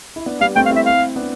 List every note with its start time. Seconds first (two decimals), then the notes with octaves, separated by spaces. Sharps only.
0.16 E4
0.26 B3 D4
0.41 G3 B3 F5
0.56 A3 C4 G5
0.66 F5
0.71 C4 E4
0.76 E5
0.86 F5
1.16 B3 D4